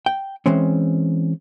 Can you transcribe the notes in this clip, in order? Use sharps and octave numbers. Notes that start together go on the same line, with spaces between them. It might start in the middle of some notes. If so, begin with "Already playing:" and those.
G5
E3 G#3 C4 C#4